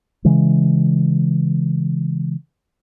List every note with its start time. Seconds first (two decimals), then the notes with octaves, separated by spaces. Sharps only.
0.25 C#3 E3 G#3